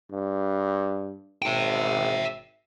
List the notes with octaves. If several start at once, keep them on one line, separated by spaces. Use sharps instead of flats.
G2
G#1 E5 G5